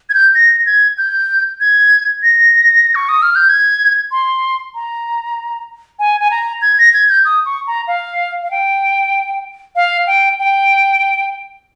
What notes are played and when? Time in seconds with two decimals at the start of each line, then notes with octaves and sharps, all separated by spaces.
0.10 G#6
0.14 G6
0.35 A#6
0.66 G#6
0.98 G6
1.60 G#6
2.23 A#6
2.95 C#6
3.09 D#6
3.22 F6
3.36 G6
3.49 G#6
4.11 C6
4.74 A#5
5.99 G#5
6.21 G#5
6.31 A#5
6.62 G#6
6.79 A#6
6.94 G#6
7.09 G6
7.25 D#6
7.46 C#6
7.67 A#5
7.88 F5
8.42 F5
8.51 G5
9.76 F5
10.07 G5
10.39 G5